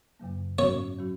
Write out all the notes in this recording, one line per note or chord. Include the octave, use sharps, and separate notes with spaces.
F#2 C#3 F#3 A#3
G#2 F#3 C#4 F#4 C#5
F#3 C#4 F#4